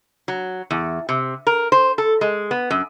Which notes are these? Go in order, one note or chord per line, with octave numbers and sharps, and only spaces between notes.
F#3
E2
C3
A#4
C5
A4
G#3
B3
F#2